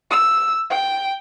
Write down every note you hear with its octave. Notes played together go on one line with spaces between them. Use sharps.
E6
G5